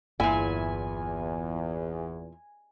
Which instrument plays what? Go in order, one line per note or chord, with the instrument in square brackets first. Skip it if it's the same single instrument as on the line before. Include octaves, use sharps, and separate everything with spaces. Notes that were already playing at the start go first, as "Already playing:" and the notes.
[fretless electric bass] G1 G2 A#3 [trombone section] E2 [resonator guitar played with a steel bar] A#2 E4 [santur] G#5